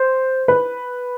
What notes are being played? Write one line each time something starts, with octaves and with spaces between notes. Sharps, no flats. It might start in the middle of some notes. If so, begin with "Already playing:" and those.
Already playing: C5
B4